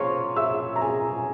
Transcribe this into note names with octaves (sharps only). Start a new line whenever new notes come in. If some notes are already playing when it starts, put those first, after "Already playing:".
Already playing: F3 A#3 C#4 C#5 C#6
E5 E6
A#5
G#4 G#5